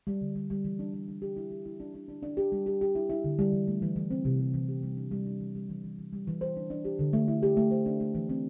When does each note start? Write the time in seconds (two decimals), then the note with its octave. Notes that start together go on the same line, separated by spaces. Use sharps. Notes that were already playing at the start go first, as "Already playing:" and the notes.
0.07 G3
0.21 D3
0.35 G3
0.50 G3
0.64 E3
0.79 D4
0.94 D4
1.08 D4
1.22 G4
1.37 E4
1.51 G4
1.66 E4
1.80 D4
1.94 D4
2.08 D4
2.23 D4
2.37 G4
2.52 G3
2.66 G4
2.81 G4
2.95 E4
3.10 E4
3.24 D3
3.39 G3
3.52 E3
3.67 A3
3.82 E3
3.96 E3
4.11 C4
4.25 C3
4.39 C3
4.54 E3
4.68 G4
4.83 G3
4.97 D4
5.11 G3
5.26 D4
5.40 E3
5.55 G3
5.69 E3
5.84 E3
5.98 E3
6.13 G3
6.27 E3
6.41 C5
6.56 D4
6.70 D4
6.85 G4
6.99 D3
7.13 A3
7.28 E4
7.43 G4
7.57 A3
7.71 C5
7.86 D4
8.00 A3
8.15 E3
8.29 C4